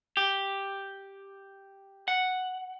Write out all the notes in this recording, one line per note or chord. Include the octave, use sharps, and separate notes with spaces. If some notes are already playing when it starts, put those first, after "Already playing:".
G4
F#5